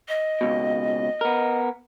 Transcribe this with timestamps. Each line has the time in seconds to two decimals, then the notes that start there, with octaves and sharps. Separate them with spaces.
0.08 D#5
0.41 C#2 B2
1.21 B3 A#4